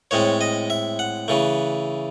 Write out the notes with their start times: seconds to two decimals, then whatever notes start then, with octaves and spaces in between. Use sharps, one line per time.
0.11 A2 G#3 C4 C#5
0.41 D#5
0.70 E5
0.99 F#5
1.28 C#3 E3 A3